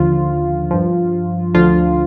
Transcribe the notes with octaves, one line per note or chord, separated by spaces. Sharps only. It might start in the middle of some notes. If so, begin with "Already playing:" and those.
Already playing: D#2 D3 F3 F4
G2 F3
D2 D3 F3 F4